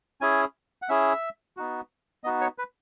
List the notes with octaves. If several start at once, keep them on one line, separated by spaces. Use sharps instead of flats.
C#4 E4 G#4 G#5
F#5
C#4 E4 G#4 E5
B3 D#4 F#4
B3 D#4 F#4 D#5
C#5
B4